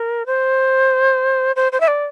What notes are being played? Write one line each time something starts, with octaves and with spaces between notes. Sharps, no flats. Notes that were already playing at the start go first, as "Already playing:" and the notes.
Already playing: A#4
C5
C5
C5
E5
D5